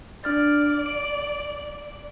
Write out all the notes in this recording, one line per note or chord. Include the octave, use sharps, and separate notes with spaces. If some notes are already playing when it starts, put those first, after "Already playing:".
D4 D5 F6 A6
D7